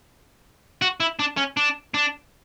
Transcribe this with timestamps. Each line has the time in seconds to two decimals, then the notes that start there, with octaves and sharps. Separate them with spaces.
0.82 F#4
1.00 E4
1.19 D4
1.37 C#4
1.57 D4
1.94 D4